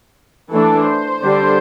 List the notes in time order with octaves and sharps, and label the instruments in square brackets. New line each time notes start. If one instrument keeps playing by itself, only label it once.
[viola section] E3 A3 D4 A4
C5
D3 G3 D4